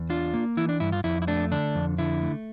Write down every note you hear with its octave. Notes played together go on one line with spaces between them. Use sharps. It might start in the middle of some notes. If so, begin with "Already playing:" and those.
Already playing: E2
D4 F4
A#3
E3 E4
D4
G2 E4
F4
F2 E4
E4
A3 D4
D3 D4
F2
D3 E4
A3